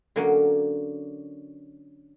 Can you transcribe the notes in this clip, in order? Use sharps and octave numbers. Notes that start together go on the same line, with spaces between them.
D3 F#3 A#3 C#4